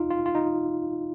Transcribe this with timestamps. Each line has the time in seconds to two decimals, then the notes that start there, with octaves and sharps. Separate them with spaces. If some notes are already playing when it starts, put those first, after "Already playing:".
Already playing: D#4 F4
0.11 F4
0.26 F4
0.35 D#4